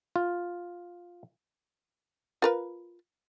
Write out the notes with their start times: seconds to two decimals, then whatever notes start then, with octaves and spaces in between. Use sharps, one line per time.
0.16 F4
2.42 F4 A#4 B4